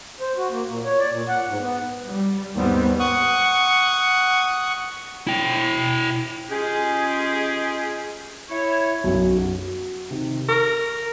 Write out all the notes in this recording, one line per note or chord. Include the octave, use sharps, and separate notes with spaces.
C5
F#4
A#3
A#2
C#5
D5
A#2
F#5
G#2
B3
G3
D#2 G#2 G3 B3 C4
F#5 C#6 D#6
E4 G5
G#3 C#4 F4 G4 G#4
E4 C#5
B1 F#2
F#4
C3 D#3
A#4 C#6